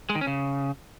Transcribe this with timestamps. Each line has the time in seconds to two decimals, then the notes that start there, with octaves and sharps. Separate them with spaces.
0.10 G#3
0.15 D#3
0.21 C#4
0.27 C#3